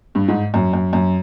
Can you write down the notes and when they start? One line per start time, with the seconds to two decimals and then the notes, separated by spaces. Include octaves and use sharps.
0.15 G2
0.28 G#2
0.54 F#2
0.73 F#2
0.93 F#2